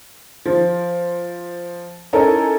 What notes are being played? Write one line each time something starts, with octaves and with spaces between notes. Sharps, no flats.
F3
C#4 D#4 E4 A4 A#4 G#5